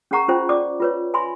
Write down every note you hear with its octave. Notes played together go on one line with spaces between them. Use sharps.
C#4 G#4 A#4 F#5 A#5 C#6
C#4 F4 C5 F#5 G5
D5 D6
F4 B4 C#5
E5 G#5 B5 C6